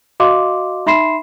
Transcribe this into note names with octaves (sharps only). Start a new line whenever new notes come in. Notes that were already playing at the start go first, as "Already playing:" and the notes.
F#4 D#5 F5 C6 D6
D#4 E5 B5 C6 C7 E7